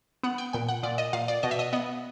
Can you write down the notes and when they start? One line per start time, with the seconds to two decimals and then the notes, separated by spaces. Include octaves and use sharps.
0.23 B3 F#5
0.38 G5
0.53 A#2 G5
0.69 F#5
0.83 A#2 D5
0.98 D#5
1.13 A#2 F5
1.28 D5
1.43 B2 D#5
1.51 E5
1.59 D#5
1.73 B3 D#5